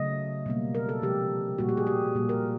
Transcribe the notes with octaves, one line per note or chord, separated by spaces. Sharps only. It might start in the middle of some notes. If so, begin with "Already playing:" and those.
Already playing: C#3 F#3 A3 D#5
B2 G3 A#3
A#4
A4
C3 F3 G#3 G4
A#2 G3 A#3 F#4
G4
G#4
G4
A#2 G3 A#3
A#4